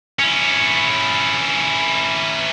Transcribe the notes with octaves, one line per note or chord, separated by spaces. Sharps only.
C#4 E4